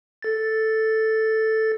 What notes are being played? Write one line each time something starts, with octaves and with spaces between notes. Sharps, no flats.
A4 A6